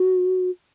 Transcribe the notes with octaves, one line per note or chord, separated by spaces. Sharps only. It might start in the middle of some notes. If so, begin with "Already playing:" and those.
Already playing: F#4